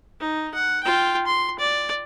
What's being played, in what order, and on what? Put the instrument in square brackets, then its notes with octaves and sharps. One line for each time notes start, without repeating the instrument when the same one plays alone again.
[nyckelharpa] D#4
F#5
F4 G5
C6
D5